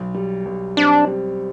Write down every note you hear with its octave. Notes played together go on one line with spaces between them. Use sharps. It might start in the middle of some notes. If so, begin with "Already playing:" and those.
Already playing: B1
G3
B1
C4 D4
G3